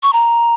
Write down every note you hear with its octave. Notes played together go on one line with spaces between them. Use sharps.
C#6
A#5